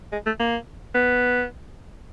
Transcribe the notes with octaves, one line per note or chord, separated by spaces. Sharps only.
G#3
A3
A#3
B3